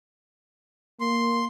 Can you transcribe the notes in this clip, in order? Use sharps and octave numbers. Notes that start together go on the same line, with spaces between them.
A#3 C6